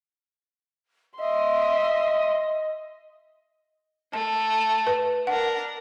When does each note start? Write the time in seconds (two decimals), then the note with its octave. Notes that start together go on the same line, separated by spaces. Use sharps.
1.19 D#5 E5 C6
4.13 A3 A5
4.87 B4
5.27 D4 A#4 F#5